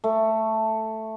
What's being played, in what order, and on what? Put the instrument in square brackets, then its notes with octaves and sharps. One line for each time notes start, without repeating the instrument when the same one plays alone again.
[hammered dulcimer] A3